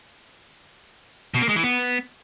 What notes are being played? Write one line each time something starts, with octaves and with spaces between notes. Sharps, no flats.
B2
A#3
G#3
E3
B3